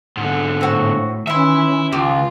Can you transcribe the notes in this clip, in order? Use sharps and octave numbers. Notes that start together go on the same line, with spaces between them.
G#2 D3
A2 C4 F#4
D#3 E3 C#4 E4 E5 C6 E6
C#2 F4 G4